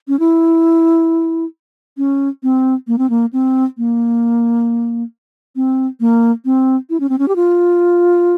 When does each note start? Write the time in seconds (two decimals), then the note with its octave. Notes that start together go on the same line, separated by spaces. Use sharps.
0.08 C#4
0.20 E4
1.97 C#4
2.43 C4
2.87 A#3
2.98 C4
3.10 A#3
3.33 C4
3.78 A#3
5.56 C4
6.00 A#3
6.45 C4
6.90 E4
7.00 C#4
7.09 C4
7.19 C#4
7.28 G4
7.36 F4